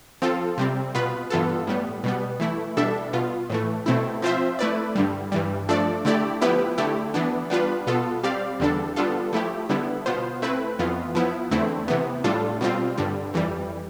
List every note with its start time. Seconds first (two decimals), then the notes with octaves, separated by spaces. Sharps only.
0.22 F3 C4 F4 A4
0.58 C3 G3 C4
0.95 B2 B3 F4 B4
1.30 G2 E3 B3 F4 A4
1.67 A2 G3 B3
2.04 B2 G3 B3
2.40 E3 A3 E4
2.77 B2 G3 D4 A4 E5
3.13 B2 B3 F4
3.50 A2 E3 A3
3.86 B2 A3 C4 E4
4.22 F3 C4 F4 C5 E5
4.59 A3 E4 B4 D5
4.95 G2 D3 G3
5.32 G2 E3 G3
5.69 F3 A3 D4 A4 D5
6.05 D3 A3 E4 G4 D5
6.41 F3 B3 E4 G4 B4
6.78 D3 A3 E4 G4
7.14 E3 B3 D4
7.50 G3 B3 D4 F4 B4
7.87 B2 B3 F4 A4
8.23 G3 C4 G4 D5 F5
8.60 E2 D3 G3 D4 A4
8.96 G3 B3 D4 F4 A4
9.33 F3 A3 E4 G4
9.69 D3 G3 B3 E4
10.06 B2 B3 F4 C5
10.42 A3 C4 E4 B4
10.79 F2 E3 B3 F4
11.15 F3 B3 E4
11.51 E2 D3 A3 C4 E4
11.88 C3 E3 B3
12.24 A2 G3 D4 F4 A4
12.61 B2 G3 C4 F4
12.98 G2 D3 G3
13.34 F2 E3 G3